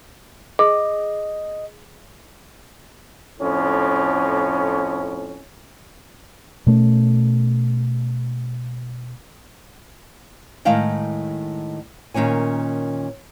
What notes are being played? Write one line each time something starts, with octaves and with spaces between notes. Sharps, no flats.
G#4 D#5
F2 A2 C#4
B2 A3 C#4
A2 D#3 G#3 E4 F5 G5
A#2 D#3 C#4 C#5 G#5